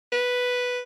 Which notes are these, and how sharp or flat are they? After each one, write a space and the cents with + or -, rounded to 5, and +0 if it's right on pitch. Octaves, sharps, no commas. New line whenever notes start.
B4 +0